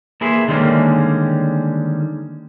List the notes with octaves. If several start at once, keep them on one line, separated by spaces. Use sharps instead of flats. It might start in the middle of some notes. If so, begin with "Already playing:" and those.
A#3 E4 G#4 B4 C5
D3 D#3 G3 G#3 A#3 C#4